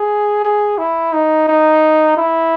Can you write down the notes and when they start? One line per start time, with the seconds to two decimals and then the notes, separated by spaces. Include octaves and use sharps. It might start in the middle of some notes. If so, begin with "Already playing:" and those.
Already playing: G#4
0.45 G#4
0.78 E4
1.13 D#4
1.48 D#4
2.17 E4